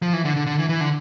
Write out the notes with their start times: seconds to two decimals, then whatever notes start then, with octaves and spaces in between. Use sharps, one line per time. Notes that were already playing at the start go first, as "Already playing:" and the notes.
0.02 F3
0.13 E3
0.25 D3
0.36 D3
0.47 D3
0.59 E3
0.69 E3
0.81 D3